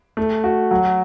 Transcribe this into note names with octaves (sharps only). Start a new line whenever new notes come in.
A3
F#4
F#3